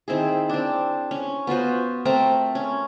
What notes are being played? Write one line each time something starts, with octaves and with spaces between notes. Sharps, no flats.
D#3 C4 E4 G#4
C4 D4
C#4
B3 F4 F#4 C5
A3 C4 A#4 A#5
C#4